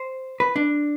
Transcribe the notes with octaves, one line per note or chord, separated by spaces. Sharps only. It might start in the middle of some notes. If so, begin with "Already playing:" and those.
Already playing: C5
B4
D4